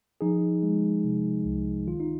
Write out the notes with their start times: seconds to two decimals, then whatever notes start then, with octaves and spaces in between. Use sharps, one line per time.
0.21 F3 D#4 G#4
0.63 G#3
1.04 C3
1.45 C2
1.88 D#3 F4
2.00 D#4